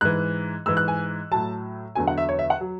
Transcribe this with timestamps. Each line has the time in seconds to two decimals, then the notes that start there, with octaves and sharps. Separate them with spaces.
0.01 G#2 E3 F#6
0.66 G#2 E3 E6
0.77 F#6
0.88 G#5
1.32 A2 F#3 A5
1.95 E2 D3 F#3 G#5
2.07 F#5
2.18 E5
2.29 C#5
2.39 E5
2.50 F#5
2.61 F#3